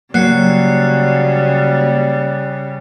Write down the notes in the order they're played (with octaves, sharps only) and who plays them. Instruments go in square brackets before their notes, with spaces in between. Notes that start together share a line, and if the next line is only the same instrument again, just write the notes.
[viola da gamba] C#3 G3 [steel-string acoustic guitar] F#3 [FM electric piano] A#3 [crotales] F#6 C7 C#7